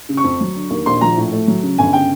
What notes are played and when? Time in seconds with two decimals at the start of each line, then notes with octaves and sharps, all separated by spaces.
0.09 C#3
0.17 C#6
0.24 F2
0.40 F#3
0.55 D3
0.70 D#2
0.86 A#1 C6
1.01 F3 A#5
1.17 A2
1.32 A3
1.47 F#3
1.63 C#3
1.78 G1 G#5
1.93 C#3 G5